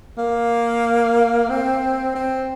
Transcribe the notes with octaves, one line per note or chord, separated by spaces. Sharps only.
A#3
C4
C4